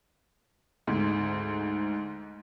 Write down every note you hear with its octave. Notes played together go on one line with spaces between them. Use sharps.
D2 G#2